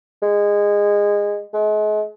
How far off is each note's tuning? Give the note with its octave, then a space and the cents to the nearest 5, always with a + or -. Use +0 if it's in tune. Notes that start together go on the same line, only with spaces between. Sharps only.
G#3 -20
G#3 +40